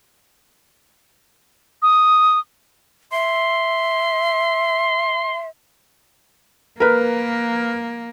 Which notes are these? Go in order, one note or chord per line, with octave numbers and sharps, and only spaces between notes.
D#6
E5 C6
A#3 A#4 B4